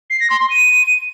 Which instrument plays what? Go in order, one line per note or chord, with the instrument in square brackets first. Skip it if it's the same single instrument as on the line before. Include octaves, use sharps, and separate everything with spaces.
[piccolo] C7
A#6
C6
C6
D#7